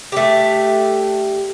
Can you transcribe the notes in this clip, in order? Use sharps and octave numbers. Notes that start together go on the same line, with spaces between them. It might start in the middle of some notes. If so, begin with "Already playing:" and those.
A3 D4 G4